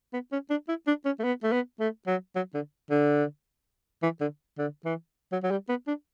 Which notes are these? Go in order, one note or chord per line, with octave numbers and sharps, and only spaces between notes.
B3
C#4
D4
E4
D4
C#4
A3
B3
A3
B3
A3
F#3
F#3
D3
D3
E3
D3
D3
E3
F#3
F#3
G3
B3
D4